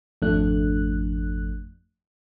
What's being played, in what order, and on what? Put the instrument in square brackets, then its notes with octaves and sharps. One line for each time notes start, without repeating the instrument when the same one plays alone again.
[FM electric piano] G#1 F2 F3 A3 D4 F#6